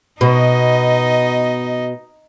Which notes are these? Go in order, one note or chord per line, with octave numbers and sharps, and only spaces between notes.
B2 D#4 D#5